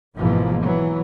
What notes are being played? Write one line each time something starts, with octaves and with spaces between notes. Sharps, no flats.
G#1 G#2 B2 E3 F3 A#3
E3 F#3